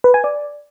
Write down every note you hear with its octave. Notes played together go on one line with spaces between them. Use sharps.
B4
G#5
D5